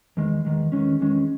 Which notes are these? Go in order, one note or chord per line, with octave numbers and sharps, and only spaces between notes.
E2 D#3 G#3
E2 D#3 G#3
E2 D#3 G#3 C#4
E2 D#3 G#3 C#4